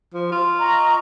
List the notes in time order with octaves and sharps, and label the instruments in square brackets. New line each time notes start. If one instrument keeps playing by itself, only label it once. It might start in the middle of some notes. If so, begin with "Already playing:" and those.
[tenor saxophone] F3
F4
[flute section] D#5 A#5 C#6